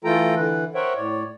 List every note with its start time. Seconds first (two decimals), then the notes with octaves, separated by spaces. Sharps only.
0.04 E3 A3 F4 A4 G5 A#5
0.36 D3 E3 B4
0.75 A#4 C5 C#5 E5 F#5 G5
0.96 A2 C#5 D5